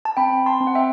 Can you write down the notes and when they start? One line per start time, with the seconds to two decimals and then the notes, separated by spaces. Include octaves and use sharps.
0.05 A5
0.17 C4 G5 B5
0.46 A5 C6
0.60 C4
0.67 F#5
0.75 E5 G5